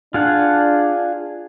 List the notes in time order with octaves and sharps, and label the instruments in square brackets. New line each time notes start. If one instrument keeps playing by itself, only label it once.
[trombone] D4 [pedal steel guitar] F4 G#4 F#5